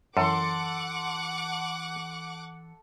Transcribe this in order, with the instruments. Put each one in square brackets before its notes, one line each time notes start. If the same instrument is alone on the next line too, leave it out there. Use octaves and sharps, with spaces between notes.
[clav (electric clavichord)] F#2 [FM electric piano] E3 C#7 [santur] A4 C6 [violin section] F#5 D6